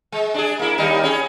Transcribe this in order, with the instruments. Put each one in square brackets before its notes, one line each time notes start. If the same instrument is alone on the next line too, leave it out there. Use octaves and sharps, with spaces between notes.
[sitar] G#3
D4 G#4
A#3 E4
D#2 G3 D#4
C#4 G#4